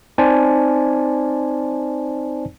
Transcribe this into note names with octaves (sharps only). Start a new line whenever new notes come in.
C4 D#4 C5 D5 G#5 A5